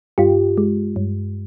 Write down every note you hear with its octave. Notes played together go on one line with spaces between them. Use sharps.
G2 F4 G4
G#3
G2